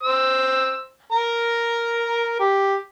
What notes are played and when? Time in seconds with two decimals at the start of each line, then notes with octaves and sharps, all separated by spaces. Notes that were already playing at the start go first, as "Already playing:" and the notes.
0.03 C5 E6
1.12 A#4 A#5
2.40 G4